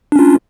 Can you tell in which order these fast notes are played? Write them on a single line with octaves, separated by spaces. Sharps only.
D4 C#4 F4